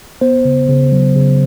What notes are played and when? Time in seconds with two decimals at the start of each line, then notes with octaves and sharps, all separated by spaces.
0.21 B3 C5
0.45 C#3
0.69 C#3
0.92 F#3
1.16 C#3